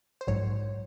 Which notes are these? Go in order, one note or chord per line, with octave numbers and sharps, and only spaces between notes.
C5
A#1 G#2 F#3 C#5